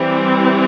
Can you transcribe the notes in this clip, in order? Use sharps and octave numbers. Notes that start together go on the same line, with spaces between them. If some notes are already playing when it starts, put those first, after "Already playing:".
Already playing: E3 G3 C4